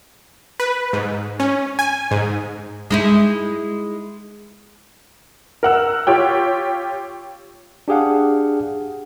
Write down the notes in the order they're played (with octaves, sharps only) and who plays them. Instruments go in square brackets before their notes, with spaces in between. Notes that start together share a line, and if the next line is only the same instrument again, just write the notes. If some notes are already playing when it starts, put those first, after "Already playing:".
[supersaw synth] B4
G#2
C#4
G#5
G#2
[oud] G#3 D#4 E4
[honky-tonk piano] A#4 F#5 E6
F4 G4 C#5 G5
[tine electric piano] D4 G4 G#4 F5 F#5